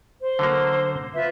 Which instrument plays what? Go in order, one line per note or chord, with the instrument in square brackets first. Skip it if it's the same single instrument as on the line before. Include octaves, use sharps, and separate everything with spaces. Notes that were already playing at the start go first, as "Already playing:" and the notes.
[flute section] C5
[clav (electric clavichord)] D3 F#3 A#3
[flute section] F4 B4 E5